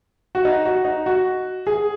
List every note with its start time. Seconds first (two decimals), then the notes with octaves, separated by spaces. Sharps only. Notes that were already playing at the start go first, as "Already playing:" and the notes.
0.35 F#4
0.45 D#4
0.65 F#4
0.85 D#4
1.06 F#4
1.67 G#4